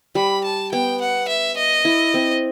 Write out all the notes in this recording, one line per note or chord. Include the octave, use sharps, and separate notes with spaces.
G3 B5
A5
B3 G5
F#5
E5
D#5
E4
C4